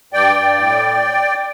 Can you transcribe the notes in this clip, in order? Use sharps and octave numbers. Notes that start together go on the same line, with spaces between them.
G2 D5 G5
G2
A2